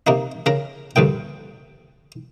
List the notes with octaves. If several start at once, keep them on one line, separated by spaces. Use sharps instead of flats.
C3 A#3 D#4
C#3 A#4 A#5
D2 G2 A#2 G5